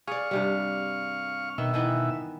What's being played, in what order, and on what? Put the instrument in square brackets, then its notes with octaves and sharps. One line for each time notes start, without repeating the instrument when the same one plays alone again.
[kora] G#4 D5 [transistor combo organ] F5 C#6
[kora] G2 C3 G3
[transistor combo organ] B2 E5 [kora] D#3
[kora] D#3 E3 B3